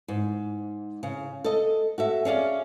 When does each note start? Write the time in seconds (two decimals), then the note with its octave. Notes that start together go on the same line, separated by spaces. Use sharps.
0.08 G#2
1.03 C#3
1.44 A4 D#5
1.98 F#4 A4 E5
2.25 C#4 G#4 D5 F5